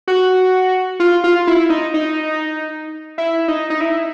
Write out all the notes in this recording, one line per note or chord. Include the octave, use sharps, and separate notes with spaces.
F#4
F4
F4
E4
D#4
D#4
E4
D#4
D#4
E4